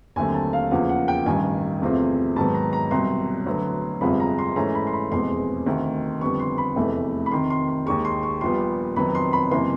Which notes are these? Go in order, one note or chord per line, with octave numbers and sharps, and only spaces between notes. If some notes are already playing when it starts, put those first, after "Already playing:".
D#2 D3 F#3 A3 C4 G#5
A5
F5
E2 C#3 F3 A#3 F#5
F#5
G5
A1 G2 D#3 G#5
E2 C3 F3 A3 C4
G#2 D#3 F#3 B3 A5
A#5
A#5
C2 B2 F#3 C6
D2 D3 F#3 B3
G1 F2 C3 F3 G#3 B5
A#5
C6
G#2 E3 A3 C#4 A#5
B5
C6
B5
F1 E2 B2 G#3 C4 C6
D2 C3 D#3
F2 D3 G3 B3 C#6
C6
B5
F1 E2 C3 E3 A3
B5
F2 C3 D#3 C6
C6
C6
D#2 D#3 G#3 C#6
C6
C#6
A#1 A#2 G3 B3 C6
F2 C3 D#3 F#3 B3 B5
C6
B5
F#1 C3 E3 C6